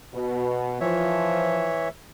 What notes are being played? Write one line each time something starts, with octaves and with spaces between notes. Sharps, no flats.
B2
E3 F3 C#5 E5